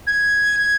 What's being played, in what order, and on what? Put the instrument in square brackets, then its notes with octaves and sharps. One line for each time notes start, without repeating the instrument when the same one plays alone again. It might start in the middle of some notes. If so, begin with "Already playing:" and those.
[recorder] G#6